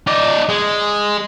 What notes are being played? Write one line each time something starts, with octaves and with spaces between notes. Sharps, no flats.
D#4 D5
G#3